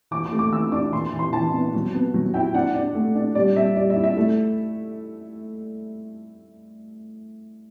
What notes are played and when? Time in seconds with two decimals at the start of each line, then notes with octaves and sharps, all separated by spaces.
0.11 E3 D6
0.26 D6
0.32 A3
0.39 D6
0.52 E3 E6
0.72 D4 D6
0.92 E3 C6
1.13 E3
1.19 C6
1.33 E3 A5
1.53 B3
1.74 F#3
1.94 B3
2.14 F#3
2.34 E4 G5
2.54 D4 F#5
2.75 D4
2.95 A3
3.15 D4
3.35 G3 D5
3.55 G3 E5
3.76 G3 D5
3.90 E5
3.96 E4
4.04 E5
4.17 A3